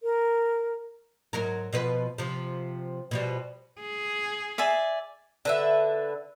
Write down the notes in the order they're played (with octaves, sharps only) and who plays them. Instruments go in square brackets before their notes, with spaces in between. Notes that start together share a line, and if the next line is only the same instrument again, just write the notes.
[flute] A#4
[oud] G#2 F#3 A#4
B2 F3 B4
C3 F3
B2 F3 G3
[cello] G#4
[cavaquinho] D5 E5 G#5
[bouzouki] D3 B4 E5